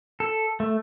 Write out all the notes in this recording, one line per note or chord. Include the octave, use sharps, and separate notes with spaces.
A4
A3